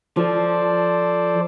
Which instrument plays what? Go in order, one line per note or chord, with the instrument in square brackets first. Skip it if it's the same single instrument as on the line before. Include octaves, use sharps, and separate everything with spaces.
[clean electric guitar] F3 [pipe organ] A4 C5 D5